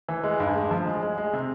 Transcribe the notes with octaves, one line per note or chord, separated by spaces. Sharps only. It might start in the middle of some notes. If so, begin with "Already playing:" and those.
E3
G#3
G2
G#3
F3
G#3
G#3
G#3
C3